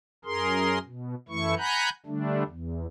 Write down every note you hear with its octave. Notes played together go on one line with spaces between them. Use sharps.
F#2 G#4 A#4 C6
B2
F#2 E3 A3 E4 C#6
F#5 G#5 A#5 B5 F#6 G6
D3 G3 A3 D4
E2